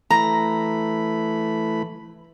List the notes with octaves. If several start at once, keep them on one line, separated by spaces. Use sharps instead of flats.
E3 A3 A#5 B5